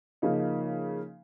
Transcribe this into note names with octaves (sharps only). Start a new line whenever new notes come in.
C#3 F3 A#3 D#4